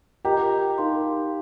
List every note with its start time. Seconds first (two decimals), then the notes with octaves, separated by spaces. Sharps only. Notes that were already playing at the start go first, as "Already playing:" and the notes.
0.25 F4 G4 A#4 D#5 G5 A#5
0.78 D#4 A#4 F5 C6